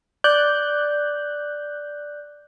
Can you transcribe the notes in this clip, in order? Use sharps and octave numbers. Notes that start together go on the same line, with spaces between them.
D5 F#6 G6